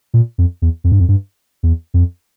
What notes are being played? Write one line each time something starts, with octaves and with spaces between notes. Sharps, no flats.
A#2
F2
E2
F2
G2
F2
G2
E2
F2